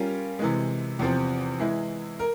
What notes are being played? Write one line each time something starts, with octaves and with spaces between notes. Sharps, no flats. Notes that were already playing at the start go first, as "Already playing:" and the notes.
Already playing: G3 C#4 F4 A#4
C3 E3 G#3
E2 C3 F3 C4
E3 G#3 E4
A#4